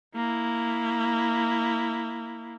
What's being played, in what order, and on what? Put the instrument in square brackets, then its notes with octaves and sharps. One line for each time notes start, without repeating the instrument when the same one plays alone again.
[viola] A#3 E4